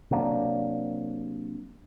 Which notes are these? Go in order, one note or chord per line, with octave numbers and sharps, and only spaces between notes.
C3 F#3 A#3 D4